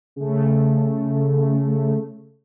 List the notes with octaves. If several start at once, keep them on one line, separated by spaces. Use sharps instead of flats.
C#3 A3